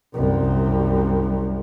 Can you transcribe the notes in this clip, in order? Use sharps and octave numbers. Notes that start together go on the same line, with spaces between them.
C2 F#2